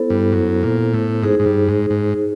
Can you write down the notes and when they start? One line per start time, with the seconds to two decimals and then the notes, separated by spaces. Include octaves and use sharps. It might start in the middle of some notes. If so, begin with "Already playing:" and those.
Already playing: B3 E4 A4 C5
0.10 G2
0.32 F#2
0.63 A#2
0.93 A2
1.22 G#2 D#4 G#4 C5
1.39 G#2
1.45 G2
1.68 G#2
1.90 G#2